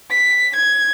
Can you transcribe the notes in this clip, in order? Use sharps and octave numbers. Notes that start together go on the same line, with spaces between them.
B6
G#6